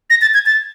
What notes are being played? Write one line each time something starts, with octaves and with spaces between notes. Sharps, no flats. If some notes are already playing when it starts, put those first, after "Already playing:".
A#6
A6
G#6
A6